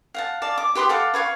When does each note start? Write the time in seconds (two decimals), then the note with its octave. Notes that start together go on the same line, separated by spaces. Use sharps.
0.14 F5 F#5 A5
0.42 D5 F5 A5
0.58 D6
0.75 G4 B4 C6 D#6
0.89 A4 F5 F#5 D6
1.14 B4 C#5 F5 C#6